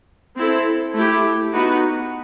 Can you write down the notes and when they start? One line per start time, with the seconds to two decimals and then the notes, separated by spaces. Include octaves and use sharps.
0.36 C4 E4 A4
0.93 A3 E4 G4
1.52 B3 D#4 F#4 B4